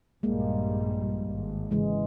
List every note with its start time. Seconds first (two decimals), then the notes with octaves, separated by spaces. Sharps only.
0.23 A#1 G2 G3 G#3 A#3
1.30 G#1
1.71 C#3 E3 G#3